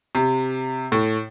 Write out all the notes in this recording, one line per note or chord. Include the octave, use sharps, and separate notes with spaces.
C3
A2